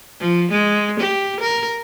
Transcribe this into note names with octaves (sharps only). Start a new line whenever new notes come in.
F3
G#3
G4
A#4